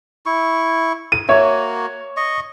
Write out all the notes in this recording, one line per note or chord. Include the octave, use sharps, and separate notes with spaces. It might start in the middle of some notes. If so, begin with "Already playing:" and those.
E4 C#6
D#7
A#3 F#4 C#5 E5
D#5 C#6